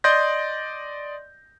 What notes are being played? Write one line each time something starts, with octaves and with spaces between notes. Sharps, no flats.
D5 D#5 C6 G6 A#6